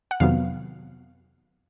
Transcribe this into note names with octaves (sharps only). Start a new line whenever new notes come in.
F#5
F2 C3 D#3 F#3 B3 F5